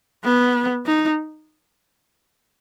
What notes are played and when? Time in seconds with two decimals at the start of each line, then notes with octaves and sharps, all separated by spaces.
0.24 B3
0.86 D#4